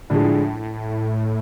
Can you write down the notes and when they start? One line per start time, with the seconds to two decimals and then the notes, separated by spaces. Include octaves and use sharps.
0.10 A2 D3 F3 G#3